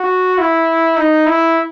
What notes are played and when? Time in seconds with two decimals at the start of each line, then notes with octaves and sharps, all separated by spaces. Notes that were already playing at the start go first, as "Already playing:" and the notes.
Already playing: F#4
0.38 E4
0.97 D#4
1.26 E4